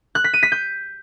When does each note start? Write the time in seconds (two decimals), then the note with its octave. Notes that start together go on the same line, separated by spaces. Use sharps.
0.15 F#6
0.24 B6
0.34 D#7
0.43 B6
0.52 G6